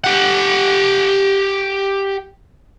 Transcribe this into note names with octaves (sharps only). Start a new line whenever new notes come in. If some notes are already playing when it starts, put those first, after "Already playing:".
G4 F#5